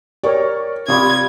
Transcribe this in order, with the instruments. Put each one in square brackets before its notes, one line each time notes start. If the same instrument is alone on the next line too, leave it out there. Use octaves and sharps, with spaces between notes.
[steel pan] G4 A#4 C#5 [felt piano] D5 C#6
[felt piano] C3 C#6 [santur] G3 F4 D#6 [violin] G#6